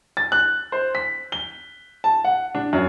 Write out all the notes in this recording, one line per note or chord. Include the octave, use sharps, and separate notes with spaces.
A6
F#6
C5
B6
G7
A5
F#5
D4
F#2